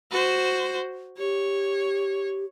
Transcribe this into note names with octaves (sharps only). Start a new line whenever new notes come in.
F#4 C5
G4 C#5